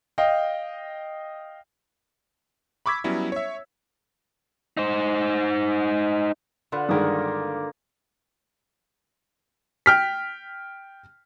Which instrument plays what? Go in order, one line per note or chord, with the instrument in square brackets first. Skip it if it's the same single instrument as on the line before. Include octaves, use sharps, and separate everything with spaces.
[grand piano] D#5 F5 G5
[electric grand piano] B5 C#6 D6 E6 G#6 B6
F#3 G3 B3 C#4 E4
C#5 E5
[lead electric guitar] D#4 C5
[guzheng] D3 [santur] F4 B4
[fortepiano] G2 D#3 G#3 [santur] A#3 D#6
[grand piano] G5 F6 B6